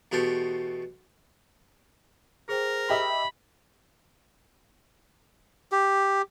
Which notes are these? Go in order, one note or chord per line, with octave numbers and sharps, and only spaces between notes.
E2 B2 A3 G4 C6
G#4 A#4 C5 G5
G4 D#5 E5 B5
G4